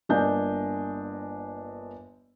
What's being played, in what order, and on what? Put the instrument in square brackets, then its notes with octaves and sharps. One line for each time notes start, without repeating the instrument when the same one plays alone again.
[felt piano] G1 A#3 D4 D#5 G#5 G6